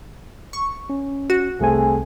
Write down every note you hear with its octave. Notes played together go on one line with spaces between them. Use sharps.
C#6
C#4
F#4
C2 A3 C4 G#4 G#5